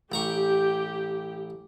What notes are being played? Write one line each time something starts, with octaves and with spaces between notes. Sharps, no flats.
A1 G4 A#5 C#6